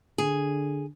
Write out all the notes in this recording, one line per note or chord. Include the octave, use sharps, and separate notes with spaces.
D3 G#4